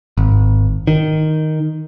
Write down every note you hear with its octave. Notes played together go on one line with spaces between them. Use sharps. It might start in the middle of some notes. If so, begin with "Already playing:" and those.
G#1
D#3